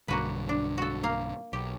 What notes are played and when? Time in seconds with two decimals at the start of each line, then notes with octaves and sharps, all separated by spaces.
0.08 B1 G2 D3 A#3 F#4 B4
0.49 D4
0.78 F#4 A4
1.03 A#3 F5
1.53 B1 G4